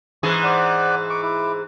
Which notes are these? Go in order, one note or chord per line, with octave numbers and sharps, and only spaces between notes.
G#2 E3 G#4 C#6
C5 D5 F#5
C#6 D6
E4 D6